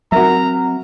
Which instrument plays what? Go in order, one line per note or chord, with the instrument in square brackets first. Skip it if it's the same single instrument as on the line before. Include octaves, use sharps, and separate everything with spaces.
[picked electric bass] F#3 C4 [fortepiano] F#4 A#4 E5 [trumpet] A#5